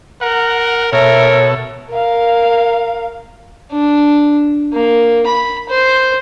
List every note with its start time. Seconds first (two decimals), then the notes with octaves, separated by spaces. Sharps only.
0.21 A#4 F#5
0.93 B2 A4 A#4 C#5 E5
1.90 A#4 F5
3.72 D4
4.73 A#3
5.27 B5
5.69 C5